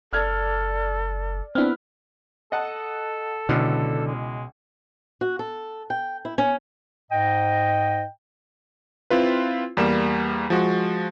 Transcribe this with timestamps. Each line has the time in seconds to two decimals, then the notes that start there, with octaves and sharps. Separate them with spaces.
0.13 F#1 A4 D5 F6 G#6
1.55 B3 C4 D4 E4 B4 F6
2.52 A4 D#5 F#5 A5
3.49 C#2 B2 D3 E3 F6
4.07 G#3
5.21 F#4
5.39 A4
5.90 G5
6.25 E4
6.38 C#4
7.11 G#2 D#5 G5
9.10 C4 E4 F4 B4
9.77 E2 G3 A#3 E7
10.50 F3 G#3 F#4